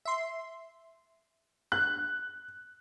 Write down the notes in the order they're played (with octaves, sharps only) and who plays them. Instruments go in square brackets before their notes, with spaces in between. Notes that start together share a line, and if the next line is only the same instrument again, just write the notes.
[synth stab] E5 C6
[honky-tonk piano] F#6